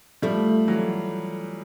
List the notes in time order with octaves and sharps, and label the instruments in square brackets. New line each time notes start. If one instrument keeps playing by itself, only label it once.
[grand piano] F3 G3 [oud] A3
[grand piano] E3 F#3